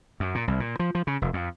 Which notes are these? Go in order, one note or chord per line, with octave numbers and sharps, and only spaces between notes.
F#2
A#2
C2
A#2
F3
F3
C#3
F1
F2